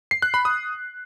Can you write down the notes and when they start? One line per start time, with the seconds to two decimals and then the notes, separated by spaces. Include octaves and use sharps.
0.11 C7
0.22 F#6
0.34 B5
0.45 D#6